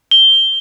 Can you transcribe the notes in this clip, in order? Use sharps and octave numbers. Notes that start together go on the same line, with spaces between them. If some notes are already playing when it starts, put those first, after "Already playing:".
G7